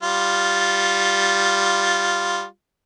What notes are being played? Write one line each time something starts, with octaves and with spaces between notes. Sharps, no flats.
G3 F4